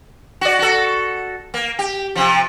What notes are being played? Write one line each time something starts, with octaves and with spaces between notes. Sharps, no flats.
F#4 D5
F#4 A4
A#3
G4
C3 F3